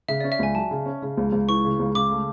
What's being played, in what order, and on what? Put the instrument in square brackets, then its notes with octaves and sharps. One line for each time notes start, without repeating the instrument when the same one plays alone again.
[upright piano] C#3 [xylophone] E5
[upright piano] C#4 [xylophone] D5
[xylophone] E5
[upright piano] C#2 [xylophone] G#5
[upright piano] F#3 [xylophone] A5
[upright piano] C#3
C#4
C#3
C#2
C#2
[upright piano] E3 [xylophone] C#6
[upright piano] C#3
C#2
[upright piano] C#3 [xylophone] D6
[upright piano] A3